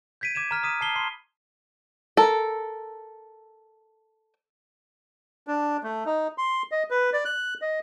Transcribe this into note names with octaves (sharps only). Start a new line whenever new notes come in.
G6 G#6 B6 D7 D#7
D6 G#6 D#7 E7
A#5 F6 B6
D#6 B6 D#7
A5 C7 G7
B5 C6 C7
A4 A#4
D4
A3
D#4
C6
D#5
B4
D5
F#6
D#5